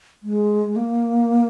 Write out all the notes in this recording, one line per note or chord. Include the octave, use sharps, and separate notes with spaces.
G#3
A#3